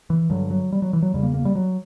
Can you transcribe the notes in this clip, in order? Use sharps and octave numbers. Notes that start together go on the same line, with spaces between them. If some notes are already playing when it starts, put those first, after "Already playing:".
E3
G2 D3 F#3
F#3
G3
F#3
E3
F#3
E2 C#3 G3
A#3
A#3
G3
F#3